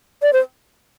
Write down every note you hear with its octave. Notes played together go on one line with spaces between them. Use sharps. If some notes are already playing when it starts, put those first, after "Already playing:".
D5
C5